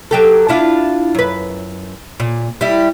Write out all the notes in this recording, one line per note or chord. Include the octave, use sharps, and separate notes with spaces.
F#3 G4 A4
D4 E4 F4
F#2 B4
A#2
G3 E4